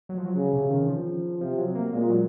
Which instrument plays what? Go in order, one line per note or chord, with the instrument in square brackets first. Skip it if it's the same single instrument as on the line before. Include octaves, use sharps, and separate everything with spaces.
[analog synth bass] F#3
F3
F#3
[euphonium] C#3
[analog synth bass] C3
D#3
F3
[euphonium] C3 [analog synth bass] F3
[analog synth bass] F#3
A#3
[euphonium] A#2 [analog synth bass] G#3
[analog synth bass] F#3